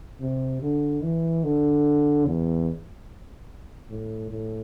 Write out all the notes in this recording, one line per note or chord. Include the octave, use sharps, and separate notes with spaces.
C3
D3
E3
D3
E2
A2
A2